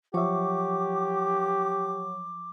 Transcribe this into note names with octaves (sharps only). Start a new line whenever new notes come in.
F3 F#3 G4 C#5 E5 C#6 D6